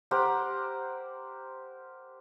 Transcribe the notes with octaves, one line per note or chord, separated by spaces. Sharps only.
G4 A#4 C5 F#5